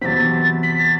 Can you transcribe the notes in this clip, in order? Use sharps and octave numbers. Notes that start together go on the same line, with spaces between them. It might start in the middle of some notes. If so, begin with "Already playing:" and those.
E2 C3 F#3 C4 A6 B6
B6
A6